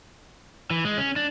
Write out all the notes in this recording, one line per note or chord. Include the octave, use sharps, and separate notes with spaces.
E3
G#3
C#4
D4